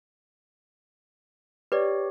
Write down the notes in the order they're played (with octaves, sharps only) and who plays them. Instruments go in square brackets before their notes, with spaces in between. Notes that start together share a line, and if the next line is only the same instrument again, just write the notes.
[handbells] G4 C#5 [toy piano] B4 D5